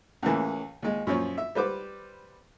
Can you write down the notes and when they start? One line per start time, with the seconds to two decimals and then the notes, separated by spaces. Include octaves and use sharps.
0.22 C#2 A2 C#3 E3 A#3
0.82 D#2 G#3
1.07 F#2 A#2 F3 C#5
1.38 E5
1.55 G3 B4 C5 D6